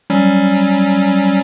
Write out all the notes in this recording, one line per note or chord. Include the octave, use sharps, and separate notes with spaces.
F#3 G3 C#4